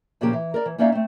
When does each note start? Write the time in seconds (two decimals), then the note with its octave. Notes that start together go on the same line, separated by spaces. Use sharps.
0.21 A#2 C#3 F3 A#3 G4
0.33 E3
0.54 A#4 D5
0.66 E3
0.78 A#3 C#4 D#4 D5 E5 F5
0.92 A3 C4